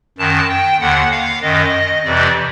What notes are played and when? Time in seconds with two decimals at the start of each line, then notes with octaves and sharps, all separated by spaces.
0.18 F#2 D#3 A5
0.49 G5
0.80 D#2 D3 F#5
1.11 F5
1.42 F#2 D#3 D#5
2.05 F2 C3 E3 D5